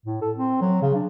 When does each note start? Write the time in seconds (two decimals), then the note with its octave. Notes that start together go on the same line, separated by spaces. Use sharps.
0.06 A2
0.21 A4
0.36 C4
0.61 F#3
0.82 C#3
0.95 D4